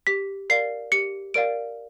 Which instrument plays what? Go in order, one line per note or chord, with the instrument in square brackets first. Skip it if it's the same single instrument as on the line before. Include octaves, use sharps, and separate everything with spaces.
[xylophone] G4 B6
A#4 D5 F5 C7
G4 C#7
A#4 D5 F5 D7